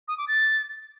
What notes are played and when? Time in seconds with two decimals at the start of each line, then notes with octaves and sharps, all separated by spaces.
0.08 D#6
0.18 D6
0.28 A6